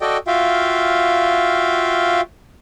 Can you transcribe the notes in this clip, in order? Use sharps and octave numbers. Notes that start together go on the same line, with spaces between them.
F#4 A4 D5 D#5 G5
F4 F#4 E5 F5 G5